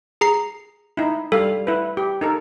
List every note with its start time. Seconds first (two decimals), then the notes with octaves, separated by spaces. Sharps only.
0.21 G#4 A#5 C7
0.97 D#4 E4
1.32 G3 A4 F5
1.67 E4 B4
1.97 G4
2.21 D#4 A4 A#4